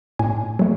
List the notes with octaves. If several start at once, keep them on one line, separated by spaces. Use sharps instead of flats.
A2 G#5
F#3 A3